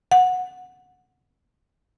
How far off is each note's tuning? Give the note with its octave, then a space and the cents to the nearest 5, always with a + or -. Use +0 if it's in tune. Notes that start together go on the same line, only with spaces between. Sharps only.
F#5 -15